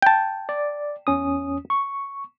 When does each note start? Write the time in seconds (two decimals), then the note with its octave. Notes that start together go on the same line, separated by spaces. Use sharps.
0.02 G5 A5
0.49 D5
1.07 E2 C#4 D#6
1.70 C#6